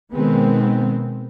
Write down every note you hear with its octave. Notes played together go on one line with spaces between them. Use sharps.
B2 D#3 G#3 B3 C4